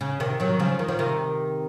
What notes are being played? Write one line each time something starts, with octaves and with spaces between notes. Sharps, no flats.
C#3
C3 D#3
D#3 F#3
C#3 F3
D#3
F3
C3 D#3